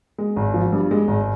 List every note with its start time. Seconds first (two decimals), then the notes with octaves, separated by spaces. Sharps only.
0.18 G#3
0.36 G#1
0.54 F3
0.72 G2
0.91 G#3
1.08 G#1